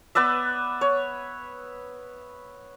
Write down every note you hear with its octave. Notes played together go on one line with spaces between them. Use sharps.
B3 B4 D5 E5
C#5